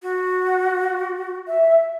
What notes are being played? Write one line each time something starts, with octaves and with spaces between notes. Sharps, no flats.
F#4
E5